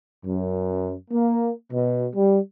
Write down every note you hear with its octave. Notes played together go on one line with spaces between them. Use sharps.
F#2
A#3
B2
G3